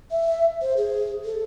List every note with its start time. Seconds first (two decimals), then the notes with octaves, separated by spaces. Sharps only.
0.11 E5
0.62 C5
0.77 G#4
1.25 A4